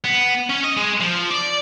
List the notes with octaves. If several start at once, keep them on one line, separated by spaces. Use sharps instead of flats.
B3
C#4
D#5
G#3
F3
D5